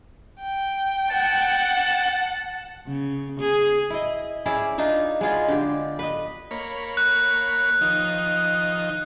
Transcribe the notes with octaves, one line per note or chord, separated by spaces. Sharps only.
G5
F#5 A5
C#3
G#4
E4 D#5
C#4 E4 G#4 D5
D4 D#4 F4
G#3 B3 F4 G#4
D3 G4
B4 D#5
A#3 C#5 B5
F#6
D#3 F3 D#4